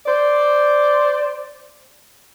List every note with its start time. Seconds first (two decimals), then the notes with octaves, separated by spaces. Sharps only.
0.07 C5 D5